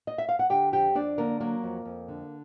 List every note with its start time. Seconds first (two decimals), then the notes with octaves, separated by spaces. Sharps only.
0.07 D#5
0.18 E5
0.29 F5
0.39 F#5
0.50 D3 G4 G5
0.72 F2 G4 G5
0.95 F2 D4 D5
1.18 D3 A#3 A#4
1.40 F#3 A#3 A#4
1.63 F2
1.85 F2
2.08 D3